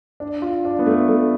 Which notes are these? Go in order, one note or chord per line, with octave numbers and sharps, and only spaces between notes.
D4
F4
D4
B3
A3
A3